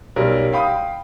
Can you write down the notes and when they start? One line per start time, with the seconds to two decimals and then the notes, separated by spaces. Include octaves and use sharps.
0.16 B1 G3 C#4 A#4
0.53 F5 G5 B5 D#6